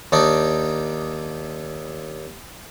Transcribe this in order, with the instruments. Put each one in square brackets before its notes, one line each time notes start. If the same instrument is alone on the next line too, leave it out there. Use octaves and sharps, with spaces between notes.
[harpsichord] D#2 D4 D#4